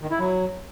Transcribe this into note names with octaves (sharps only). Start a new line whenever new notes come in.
D#3
E4
F#3